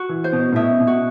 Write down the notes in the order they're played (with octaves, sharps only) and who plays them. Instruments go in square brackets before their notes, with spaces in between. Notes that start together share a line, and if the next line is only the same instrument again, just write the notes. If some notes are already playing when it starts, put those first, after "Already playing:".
Already playing: [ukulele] F#4
[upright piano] E3
[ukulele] C5
[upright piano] B2
A2
[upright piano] B2 [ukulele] E5
[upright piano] B2
[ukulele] F#4